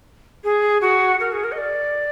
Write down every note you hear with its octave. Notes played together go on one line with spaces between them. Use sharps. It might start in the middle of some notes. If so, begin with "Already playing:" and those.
G#4
F#4
A#4
G#4
A#4
D#5
D5